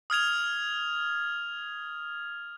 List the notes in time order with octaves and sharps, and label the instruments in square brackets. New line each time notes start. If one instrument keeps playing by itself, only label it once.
[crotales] D#6 F6 G#6 F7